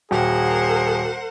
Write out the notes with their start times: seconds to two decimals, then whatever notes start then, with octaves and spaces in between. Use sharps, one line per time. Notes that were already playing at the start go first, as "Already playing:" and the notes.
0.11 D#1 F#4 G#4 A#4 C5 F#5 G5